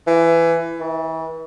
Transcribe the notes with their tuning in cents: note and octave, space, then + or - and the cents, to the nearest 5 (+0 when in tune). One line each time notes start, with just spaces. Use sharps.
E3 +20
E3 -35